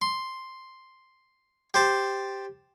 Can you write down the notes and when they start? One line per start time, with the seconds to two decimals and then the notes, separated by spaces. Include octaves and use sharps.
0.02 C6
1.74 G4 C5 A5